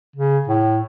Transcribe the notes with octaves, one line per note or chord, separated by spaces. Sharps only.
C#3
A2